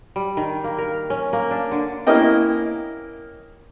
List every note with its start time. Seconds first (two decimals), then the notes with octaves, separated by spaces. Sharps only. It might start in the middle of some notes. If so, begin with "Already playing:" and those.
0.16 G3
0.37 D#3
0.64 A#3
0.78 A#4
1.10 C#4
1.33 A#3
1.51 D4
1.72 D3
2.07 A#3 C#4 E4 A#4 D#5 G5